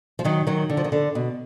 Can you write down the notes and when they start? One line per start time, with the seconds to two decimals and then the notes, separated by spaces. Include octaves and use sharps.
0.19 F3
0.24 D#3 F#3
0.47 D#3 F#3
0.70 D3
0.77 F3
0.84 D#3
0.92 D3
1.15 B2